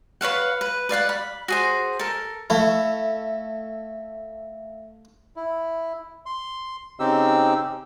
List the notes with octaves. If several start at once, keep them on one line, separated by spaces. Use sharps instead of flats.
B4 C#5 F5 F#5
B4
B4 D5 F5 F#5
B5
F#4 G#4 C5
A4 A#4
A3 E4 E5 F5
E4
C6
C#3 C4 D#4 G4 E6